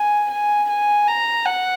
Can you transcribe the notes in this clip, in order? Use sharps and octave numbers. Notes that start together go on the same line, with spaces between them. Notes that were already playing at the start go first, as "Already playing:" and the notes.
Already playing: G#5
G#5
G#5
A#5
F#5